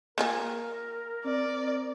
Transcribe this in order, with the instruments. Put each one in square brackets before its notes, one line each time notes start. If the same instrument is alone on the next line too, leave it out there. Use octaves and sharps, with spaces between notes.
[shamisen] A#3 F4 G#4 [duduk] A#4
[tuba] C4 [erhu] D5